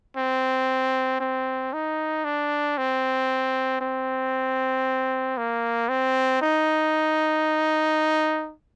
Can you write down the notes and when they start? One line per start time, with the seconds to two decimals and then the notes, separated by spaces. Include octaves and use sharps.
0.17 C4
1.20 C4
1.73 D#4
2.24 D4
2.78 C4
3.81 C4
5.38 A#3
5.89 C4
6.41 D#4